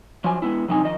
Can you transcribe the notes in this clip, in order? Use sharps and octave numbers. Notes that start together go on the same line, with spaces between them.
F3 F#3 G#5
G#3 B3 E4
F2 C3 F#3 C4 D#4 G#5
D#3 F3 D#5